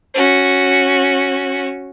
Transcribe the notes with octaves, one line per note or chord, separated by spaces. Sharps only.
C#4 F#4